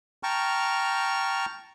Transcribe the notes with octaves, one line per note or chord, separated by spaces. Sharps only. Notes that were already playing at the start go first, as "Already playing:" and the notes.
G5 A5 A#5 C#6 F6